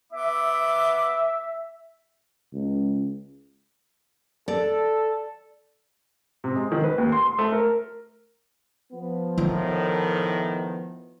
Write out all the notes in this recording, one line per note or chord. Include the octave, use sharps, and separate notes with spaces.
B3 E5 D6
C#2
A4 D5
C3
G#3
D#3
B4
D#2
C6
C6
A3
A#4
F3 B3
A2 D#3 F4